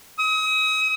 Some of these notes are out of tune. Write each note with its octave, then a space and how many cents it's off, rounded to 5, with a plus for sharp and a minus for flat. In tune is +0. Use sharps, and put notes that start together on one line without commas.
D#6 +40